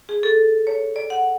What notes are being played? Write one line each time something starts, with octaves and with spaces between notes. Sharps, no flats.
G#4
A4
C#5
D5
F#5